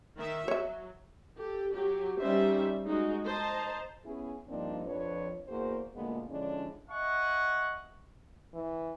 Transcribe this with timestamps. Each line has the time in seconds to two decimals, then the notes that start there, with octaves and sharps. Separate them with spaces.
0.17 D#3 E5
0.48 F#3 C#5 E5
1.37 G4 A4
1.73 F#3 G4
2.20 G3 C#4 D#4 C5 E5
2.86 G#3 D#4 F#4
3.26 C5 D#5 A5 A#5
4.05 B3 C#4 E4 G#4
4.48 G2 F3 A#3 C4 D4 D#4
4.85 F2 F3 D4 B4 C#5
5.48 E2 A#3 F#4 G#4 C5
5.95 D2 A#2 G#3 A#3 B3
6.29 D3 F3 G#3 C#4 D4 E4
6.90 D#5 E5 F#5 G#5 C#6
8.54 E3